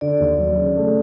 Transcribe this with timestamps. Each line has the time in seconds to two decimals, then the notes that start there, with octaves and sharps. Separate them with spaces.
0.01 D3 D5
0.20 D#2
0.38 F#3
0.57 C#3
0.77 A3